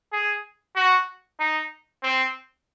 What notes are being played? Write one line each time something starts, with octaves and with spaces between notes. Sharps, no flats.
G#4
F#4
D#4
C4